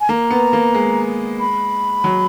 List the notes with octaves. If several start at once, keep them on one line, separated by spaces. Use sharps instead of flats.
G#5
A#3 A#5
B3
A#3
G#3
B5
F#3